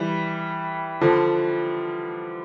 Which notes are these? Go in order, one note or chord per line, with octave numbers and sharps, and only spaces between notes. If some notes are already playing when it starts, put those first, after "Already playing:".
Already playing: E3 G3
D3 F3